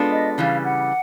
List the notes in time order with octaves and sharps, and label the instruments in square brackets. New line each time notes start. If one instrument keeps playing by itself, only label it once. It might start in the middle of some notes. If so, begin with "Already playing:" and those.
Already playing: [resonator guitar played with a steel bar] G#3 B3 D4 F4 A4
[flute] D#5
[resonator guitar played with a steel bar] C#3 E3 G3 [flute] F5
[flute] F#5